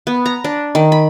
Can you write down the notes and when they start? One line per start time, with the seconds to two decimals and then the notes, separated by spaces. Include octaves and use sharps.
0.07 B3
0.26 A#5
0.44 D4
0.75 D#3
0.92 B5